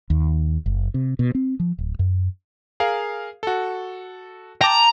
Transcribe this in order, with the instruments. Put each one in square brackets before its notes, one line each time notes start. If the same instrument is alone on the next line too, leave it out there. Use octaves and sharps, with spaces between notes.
[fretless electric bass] D#2
F#1
C3
B2
C4
F3
D1
F#2
[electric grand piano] G#4 A#4 F5
F#4 A4
[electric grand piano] G5 A5 D6 [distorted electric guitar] A#5